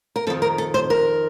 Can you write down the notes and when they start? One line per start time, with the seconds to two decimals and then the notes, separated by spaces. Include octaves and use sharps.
0.16 A#4
0.27 F2 A4
0.30 D#3
0.42 A#4
0.58 A4
0.74 C5
0.90 A#4